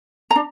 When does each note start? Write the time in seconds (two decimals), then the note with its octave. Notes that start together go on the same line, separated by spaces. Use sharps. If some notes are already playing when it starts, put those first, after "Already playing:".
0.31 A#5
0.36 D4